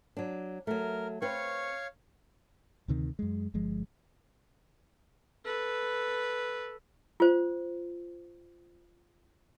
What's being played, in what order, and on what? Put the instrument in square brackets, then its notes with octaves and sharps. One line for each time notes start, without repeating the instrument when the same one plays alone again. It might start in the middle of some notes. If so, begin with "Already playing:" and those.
[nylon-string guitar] F#3 D4
[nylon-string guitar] F#3 A3 [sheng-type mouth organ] A#4
[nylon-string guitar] C4 B4 [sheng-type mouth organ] C#5 F5 C#6
[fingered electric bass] D2 C3 D#3
F#2 G#3
G1 F3 G#3
[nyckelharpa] A4 B4
[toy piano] F4 C5